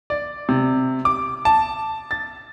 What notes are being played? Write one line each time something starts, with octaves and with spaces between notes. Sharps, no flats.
D5
C3
D6
A5
A6